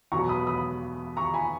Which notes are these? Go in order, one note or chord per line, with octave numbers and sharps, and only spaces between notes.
E2 B2 F#3 A#5 C#6
B5 D#6
B5 D#6
A#5 C#6
G#5 B5